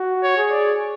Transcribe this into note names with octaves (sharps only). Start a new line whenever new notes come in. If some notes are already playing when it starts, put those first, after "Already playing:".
Already playing: F#4
C#5
G#4
D5